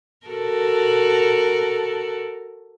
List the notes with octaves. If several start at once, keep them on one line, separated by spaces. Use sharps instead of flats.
F#4 A4 A#4